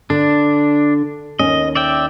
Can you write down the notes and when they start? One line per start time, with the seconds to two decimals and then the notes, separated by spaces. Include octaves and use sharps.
0.10 D3 D4
1.39 D#2 C#4 D#5
1.75 D5 E5 G5